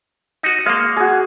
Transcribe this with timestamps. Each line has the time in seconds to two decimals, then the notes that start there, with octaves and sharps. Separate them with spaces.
0.43 D#4 F#4
0.66 G#3 A#3 F5
0.96 F#4 G#4